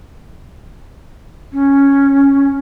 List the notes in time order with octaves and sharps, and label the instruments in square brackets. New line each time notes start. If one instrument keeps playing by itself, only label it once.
[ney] C#4